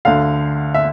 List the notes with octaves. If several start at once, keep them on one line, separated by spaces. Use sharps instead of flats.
D2 D3 F5
E5